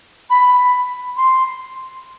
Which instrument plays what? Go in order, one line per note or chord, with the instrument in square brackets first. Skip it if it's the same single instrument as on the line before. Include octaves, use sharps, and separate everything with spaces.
[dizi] B5
C6